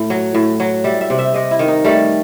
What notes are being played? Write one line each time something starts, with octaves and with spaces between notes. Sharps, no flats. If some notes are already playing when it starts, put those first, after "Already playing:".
Already playing: A2
F#3
A2
F#3
G3 E5
E5
C3
E5
C3 D#5
E4
D#3
D#4
G3 A3